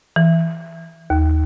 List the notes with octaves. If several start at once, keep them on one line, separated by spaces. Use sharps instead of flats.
E3
D#2